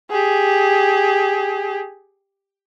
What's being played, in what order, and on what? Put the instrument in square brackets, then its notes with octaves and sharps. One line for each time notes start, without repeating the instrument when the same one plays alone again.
[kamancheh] G4 G#4